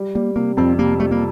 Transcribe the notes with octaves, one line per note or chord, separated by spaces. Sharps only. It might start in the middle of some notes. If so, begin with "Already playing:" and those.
Already playing: G3
G3 A#3
C3 A#3
F2 C4
C3 A#3
G3 A3
A#3